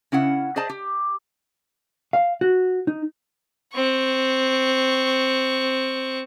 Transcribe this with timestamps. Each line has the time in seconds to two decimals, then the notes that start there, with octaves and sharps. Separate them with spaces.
0.12 C#3 C#4 E4 F#5
0.56 G#4 C5 D5 D#5 A5
0.70 G4
2.13 F5
2.41 F#4
2.87 D#4
3.73 C4 C#6